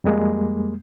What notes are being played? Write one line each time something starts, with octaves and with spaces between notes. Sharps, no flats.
F2 G3 G#3 A#3